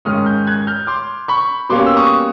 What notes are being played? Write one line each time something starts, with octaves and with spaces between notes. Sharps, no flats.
G#2 D#3 G#3 C#4 D#6 F6
F6 G6
F#6 G#6
F6 G6
C6 D6
B5 C#6
B2 G3 A#3 C#4 C6 D6
E6
C#6 D#6